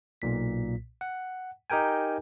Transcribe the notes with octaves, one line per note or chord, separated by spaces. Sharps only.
B1 A#2 B6
F#5
D#4 G4 A#4 G5 G#5